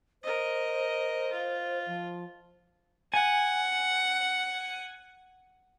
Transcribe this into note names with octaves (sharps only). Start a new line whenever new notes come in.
A#4 C5 D#5
F4
F3
F#5 G#5